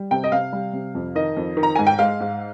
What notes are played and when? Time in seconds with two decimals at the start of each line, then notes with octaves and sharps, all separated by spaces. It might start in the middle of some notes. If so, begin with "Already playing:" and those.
Already playing: G3
0.11 C3 G5
0.24 D#5
0.32 C3 F5
0.53 G3
0.73 C3
0.95 F2
1.15 D#3 D#5
1.36 F2
1.57 D#3
1.63 A#5
1.75 G#2 G#5
1.87 G5
1.99 G#3 F5
2.20 G#2